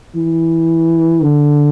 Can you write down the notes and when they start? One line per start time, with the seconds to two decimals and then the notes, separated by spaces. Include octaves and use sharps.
0.15 E3
1.23 D3